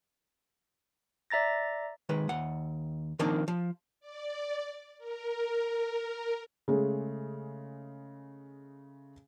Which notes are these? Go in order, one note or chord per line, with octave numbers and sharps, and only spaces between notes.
D5 E5 A#5 A6 A#6
D#3 G#3 B4
D#2 F#5
D#3 F3 A#3 C4 D4 D#4
F3
D5
A#4
C#3 G#3 A3